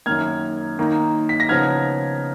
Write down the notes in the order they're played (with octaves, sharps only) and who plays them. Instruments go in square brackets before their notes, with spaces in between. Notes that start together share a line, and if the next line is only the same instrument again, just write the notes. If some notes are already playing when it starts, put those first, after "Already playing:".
[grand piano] F#2 D#3 A#3 F6 G#6
D#3 A#3 D#4
B6
A#6
C#3 F3 B3 D#4 F6 G#6